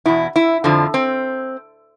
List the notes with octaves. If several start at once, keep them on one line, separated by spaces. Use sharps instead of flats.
E2 B2 E4
E4
F2 D3 F3
C4